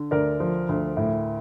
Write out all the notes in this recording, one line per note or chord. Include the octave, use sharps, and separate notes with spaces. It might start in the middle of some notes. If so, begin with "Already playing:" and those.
Already playing: D3
D2 A#4 D5
F3
D2
A2